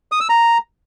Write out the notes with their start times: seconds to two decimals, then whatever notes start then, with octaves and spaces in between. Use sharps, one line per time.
0.12 D#6
0.21 E6
0.29 A#5